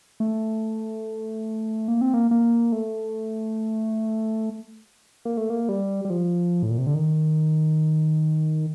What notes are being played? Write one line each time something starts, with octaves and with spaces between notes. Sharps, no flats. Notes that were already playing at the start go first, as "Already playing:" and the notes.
A3
A#3
C4
A#3
A#3
A3
A#3
A3
A#3
G3
G3
F3
A2
A#2
C3
D3
D#3